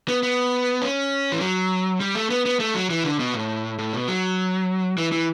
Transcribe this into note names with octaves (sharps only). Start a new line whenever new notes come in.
B3
B3
C#4
E3
F#3
G3
A3
B3
B3
A3
F#3
E3
D3
B2
A2
A2
B2
F#3
E3
E3